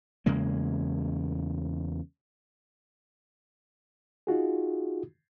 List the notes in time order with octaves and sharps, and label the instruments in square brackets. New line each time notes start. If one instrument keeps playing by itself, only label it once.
[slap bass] E2 C#3 G#3 A#3
[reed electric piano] D#4 F4 F#4 G#4